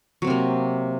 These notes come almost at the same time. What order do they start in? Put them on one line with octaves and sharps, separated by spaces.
F#3 C4 C3 A#3